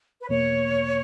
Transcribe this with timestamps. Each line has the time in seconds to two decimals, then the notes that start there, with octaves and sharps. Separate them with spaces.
0.20 B4
0.28 E2 B2 A#3 C#5